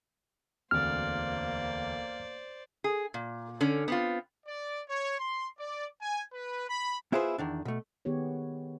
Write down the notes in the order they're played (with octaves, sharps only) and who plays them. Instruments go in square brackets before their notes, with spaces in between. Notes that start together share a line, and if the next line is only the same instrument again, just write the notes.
[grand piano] E1 D2 C4 [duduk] A#3 [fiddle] C5 D5 [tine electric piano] F6
[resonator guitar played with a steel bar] G#4
A#2
D3 C#4
B3 C4 F4
[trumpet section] D5
C#5
C6
D5
G#5
B4
B5
[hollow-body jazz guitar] B3 E4 F4 G#4 B4 C5
E2 D#3 D4
B2 A3
[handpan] D#3 B3 G4 G#4 C#5